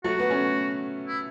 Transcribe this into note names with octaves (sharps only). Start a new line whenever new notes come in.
F#3 A3 F#4
B3
A3 C#4
E4